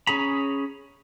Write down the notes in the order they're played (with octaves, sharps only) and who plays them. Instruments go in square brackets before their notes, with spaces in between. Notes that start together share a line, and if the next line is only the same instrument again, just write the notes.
[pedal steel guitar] C#4 G#4 A#5 B5